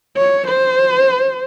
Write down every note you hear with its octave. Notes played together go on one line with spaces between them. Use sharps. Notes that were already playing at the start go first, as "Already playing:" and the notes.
C#5
C5